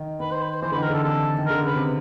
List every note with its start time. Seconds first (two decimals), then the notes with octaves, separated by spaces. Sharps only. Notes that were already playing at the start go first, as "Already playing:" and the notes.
Already playing: D#3
0.20 D#3 B4
0.31 C5
0.41 B4
0.51 C5
0.62 E3 C5
0.72 D3 B4
0.76 D#3
0.83 A#4
0.90 D3 A4
1.04 C3 A4
1.37 D#3
1.46 D3 A#4
1.63 C#3 B4
1.75 C3